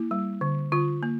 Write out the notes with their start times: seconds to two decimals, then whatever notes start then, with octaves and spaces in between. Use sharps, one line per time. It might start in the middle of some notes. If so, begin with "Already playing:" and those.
Already playing: A#3 E4
0.11 G3
0.41 D3
0.72 D3 F4
1.03 A#3